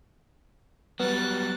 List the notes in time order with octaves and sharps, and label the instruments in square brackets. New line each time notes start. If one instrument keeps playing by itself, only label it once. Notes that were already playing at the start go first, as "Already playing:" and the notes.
[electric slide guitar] F#3 G3 [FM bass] B3 [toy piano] B4 [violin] F#6 A6